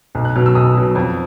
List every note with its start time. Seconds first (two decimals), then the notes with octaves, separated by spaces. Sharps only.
0.15 B1
0.25 F#6
0.36 B2 F#3 F6
0.46 E6
0.55 B1 D#6
0.76 B2 F#3
0.95 F2